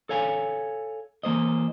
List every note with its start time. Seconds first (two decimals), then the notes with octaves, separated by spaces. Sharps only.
0.09 A4 C#5 F5 G#5
1.23 E3 A#3 C5 D#5